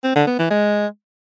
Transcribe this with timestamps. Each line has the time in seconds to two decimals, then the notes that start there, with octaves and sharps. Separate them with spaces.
0.04 C4
0.15 D3
0.27 B3
0.39 E3
0.50 G#3